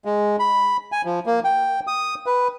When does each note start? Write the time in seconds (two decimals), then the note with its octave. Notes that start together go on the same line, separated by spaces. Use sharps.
0.05 G#3
0.39 B5
0.92 G#5
1.05 F3
1.26 A#3
1.44 G5
1.87 D#6
2.26 B4